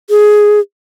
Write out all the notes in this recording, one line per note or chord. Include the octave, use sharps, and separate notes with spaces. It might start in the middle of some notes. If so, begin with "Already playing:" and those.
G#4